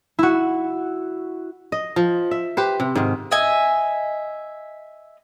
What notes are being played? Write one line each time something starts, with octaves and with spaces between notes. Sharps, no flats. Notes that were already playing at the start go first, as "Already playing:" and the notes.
E4 F#4
D#5
F3
E5
G4 B4 C5
C3
G#2 D#3
D#5 E5 G#5